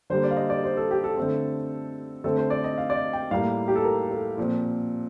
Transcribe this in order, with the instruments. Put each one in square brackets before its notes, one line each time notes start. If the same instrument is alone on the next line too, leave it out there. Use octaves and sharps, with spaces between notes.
[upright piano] D3 G3 A#3 C5
D5
F5
D#5
D5
C5
A4
G4
A4
D3 A3 C4
D3 A3 C4 A4
C5
D5
D#5
F5
D5
D#5
G5
A2 G3 A#3 F5
G4
A4
A#4
A4
A#2 F3 C4